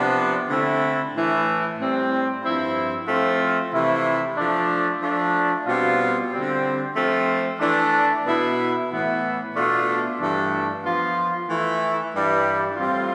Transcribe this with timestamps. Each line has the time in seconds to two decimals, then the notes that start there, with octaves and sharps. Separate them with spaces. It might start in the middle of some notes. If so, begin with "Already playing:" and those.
Already playing: C3 F3 B3 D4
0.49 D3 A3 C4 E4
1.13 A2 E3 A3
1.78 A2 G3 C4
2.43 G2 F3 C4 E4
3.07 F3 A3 C4 F4
3.72 C3 E3 A3 E4
4.36 F3 A3 D4
5.01 F3 A3 D4
5.66 B2 G3 C4 F4
6.30 D3 G3 C4
6.95 F3 A3 C4 F4
7.59 E3 A3 D4
8.24 B2 B3 E4
8.89 A2 E3 B3 E4
9.53 B2 A3 D4 F4
10.18 G2 E3 A3 D4
10.83 F3 B3 F4
11.47 E3 A3 E4
12.12 G2 E3 G3
12.76 A2 G3 C4 F4